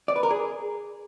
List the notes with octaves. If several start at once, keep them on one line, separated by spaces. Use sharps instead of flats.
D5
B4
A#4
G#4